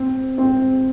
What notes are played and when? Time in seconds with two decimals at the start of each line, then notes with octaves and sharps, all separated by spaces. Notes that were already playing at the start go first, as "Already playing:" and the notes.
Already playing: C4
0.38 C4